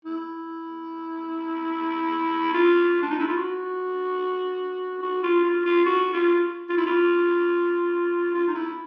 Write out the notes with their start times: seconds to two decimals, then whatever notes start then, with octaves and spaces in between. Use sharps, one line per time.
0.05 E4
2.54 F4
3.03 D4
3.11 D#4
3.19 E4
3.28 F4
3.37 F#4
5.03 F#4
5.23 F4
5.44 F4
5.66 F4
5.86 F#4
6.13 F4
6.69 F4
6.77 E4
6.86 F4
8.35 F4
8.48 D#4
8.55 E4